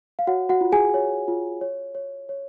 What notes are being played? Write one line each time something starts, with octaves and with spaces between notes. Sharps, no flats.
F5
F#4 C#5 F#5
F#4 F#5
F4
G#4 G#5
C#5
F4
C#5
C#5
C#5